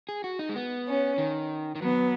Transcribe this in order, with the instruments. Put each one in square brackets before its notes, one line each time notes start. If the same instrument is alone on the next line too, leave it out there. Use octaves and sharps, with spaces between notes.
[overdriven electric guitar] G#4
F#4
D#4
G#3
B3
[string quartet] C#4
[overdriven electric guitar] D#3
D#3
[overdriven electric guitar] F#3 [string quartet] B3